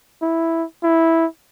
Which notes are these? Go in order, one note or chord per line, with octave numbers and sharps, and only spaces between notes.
E4
E4